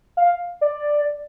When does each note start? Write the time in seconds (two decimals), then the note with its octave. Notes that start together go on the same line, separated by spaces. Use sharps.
0.17 F5
0.61 D5